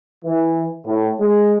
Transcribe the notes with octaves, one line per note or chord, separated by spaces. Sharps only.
E3
A2
G#3